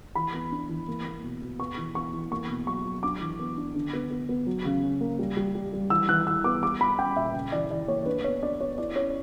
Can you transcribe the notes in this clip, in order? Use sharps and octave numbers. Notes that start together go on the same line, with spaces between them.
E3 B5
B3
D4
E3
A#3
A#3
B2
B2
B3 C#6
E3
B3 C#6
E3
A#3 C#6
B2
F#3 C#6
F#3
D4 D6
E3
B3
D4
D3
B3
B3
B3
F#3
C#3
C#4
A#3
G3
G3
G3
G3
E3 E6
E3 F#6
E3 E6
B3 D6
G3 D6
G3 B5
C#4 G5
A#2 E5
C#3
E3 D5
E3 D5
A#3 C#5
D4 B4
B3 C#5
D4 D5
B3 C#5
E4 D5
C#4 C#5